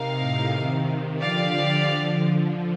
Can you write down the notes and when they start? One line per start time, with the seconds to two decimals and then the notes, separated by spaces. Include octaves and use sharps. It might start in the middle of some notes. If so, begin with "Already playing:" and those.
Already playing: C3 D#4 A#4 F5
0.18 A2
0.52 C3 D#3
1.19 D3 F3 G4 D5 F5